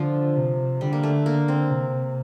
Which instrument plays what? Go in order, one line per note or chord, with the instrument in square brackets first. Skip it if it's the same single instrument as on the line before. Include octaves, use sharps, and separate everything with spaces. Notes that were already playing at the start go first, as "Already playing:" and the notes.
Already playing: [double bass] D3 [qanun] F3
[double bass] C3
[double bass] D3 [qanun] G3
[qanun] A#3
A3
A#3
C4
[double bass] C3